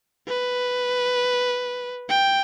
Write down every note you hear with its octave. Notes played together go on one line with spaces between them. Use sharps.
B4
G5